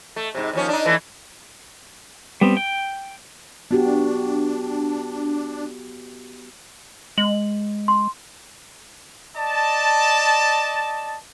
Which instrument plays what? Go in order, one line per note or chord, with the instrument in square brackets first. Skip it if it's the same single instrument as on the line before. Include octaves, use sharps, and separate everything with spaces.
[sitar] A3
G#2 C3
D#2 F3 C#4
D4 D#4
E3 A3
[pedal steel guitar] G3 B3 C4
G5
[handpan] B3 F#4 G4 [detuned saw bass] D4
[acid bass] G#3 [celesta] F#7
[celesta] C6
[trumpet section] D5 D#5 A5